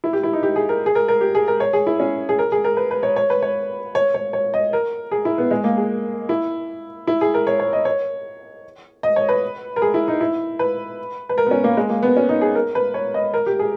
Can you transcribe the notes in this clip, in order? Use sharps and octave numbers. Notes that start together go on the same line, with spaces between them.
E4
G4
E4
D#4
G4
G#4
A#4
G#4
A#4
A#4
G4
G#4
A#4
C#5
G#4
E4
C#4
G#4
A#4
G#4
A#4
B4
B4
C#5
C#5
B4
C#5
C#5
C#5
C#5
D#5
A#4
G#4
E4
B3
G#3
A#3
G#4
E4
E4
G#4
A#4
C#5
C#5
D#5
C#5
D#5
C#5
B4
A#4
G#4
E4
D#4
E4
B4
B4
A#4
B3
C#4
A#3
G#3
A#3
B3
C#4
D#4
G#4
A#4
B4
C#5
D#5
A#4
G4
G#4